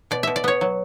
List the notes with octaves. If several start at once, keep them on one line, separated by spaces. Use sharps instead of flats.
B2 D5
B2 E5
D5
B3 C#5
F#3